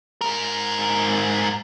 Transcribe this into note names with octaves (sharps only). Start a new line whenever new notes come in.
G#2 A#4